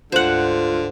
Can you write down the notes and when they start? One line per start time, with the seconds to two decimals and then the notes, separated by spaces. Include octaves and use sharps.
0.12 D2 G#2 D3 F4 C5 F#5